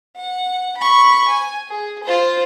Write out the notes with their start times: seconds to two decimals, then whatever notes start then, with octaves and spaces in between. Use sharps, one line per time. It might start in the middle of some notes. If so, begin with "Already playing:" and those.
0.16 F#5
0.77 B5 C#6
1.28 G#5
1.69 G#4
2.04 F4 C5